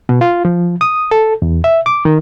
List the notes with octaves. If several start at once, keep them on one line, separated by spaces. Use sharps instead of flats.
B2
F4
F3
D#6
A4
E2
E5
D6
D#3